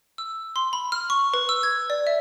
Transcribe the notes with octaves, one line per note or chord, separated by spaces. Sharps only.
E6
C6
B5
F6
C#6
B4
E6
G#6
D5
E5